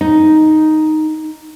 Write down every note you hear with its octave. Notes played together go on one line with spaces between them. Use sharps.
D#4